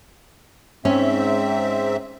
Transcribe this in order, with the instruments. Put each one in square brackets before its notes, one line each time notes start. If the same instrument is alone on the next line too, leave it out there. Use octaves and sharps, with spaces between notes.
[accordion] G#2 C4 E5 [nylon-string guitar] C#4